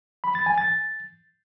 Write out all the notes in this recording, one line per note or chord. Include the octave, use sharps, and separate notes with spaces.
B5
A6
G#5
A6